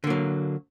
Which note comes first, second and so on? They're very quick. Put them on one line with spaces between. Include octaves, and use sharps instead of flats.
D3 A#3 F#3